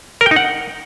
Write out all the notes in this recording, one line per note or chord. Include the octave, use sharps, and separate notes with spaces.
A#4
G5
D#4
F#5